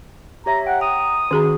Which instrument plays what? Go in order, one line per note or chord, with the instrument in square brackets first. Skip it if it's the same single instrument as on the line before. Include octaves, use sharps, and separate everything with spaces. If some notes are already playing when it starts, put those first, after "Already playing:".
[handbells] G4 C#5 E5 [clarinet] A#5
[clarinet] F#5 [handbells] G5
[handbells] A#5 [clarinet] D#6
[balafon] D#3 G#4 A#5 [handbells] C#4 F#4